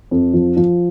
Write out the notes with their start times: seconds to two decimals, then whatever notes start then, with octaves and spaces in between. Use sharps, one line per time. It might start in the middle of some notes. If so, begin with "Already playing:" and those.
0.11 F2
0.34 F3
0.57 F3